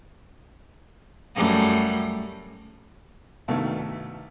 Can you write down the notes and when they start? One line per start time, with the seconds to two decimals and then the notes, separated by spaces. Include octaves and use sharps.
1.35 F#2 G3 A3
3.48 C2 G2 B2 D#3 A3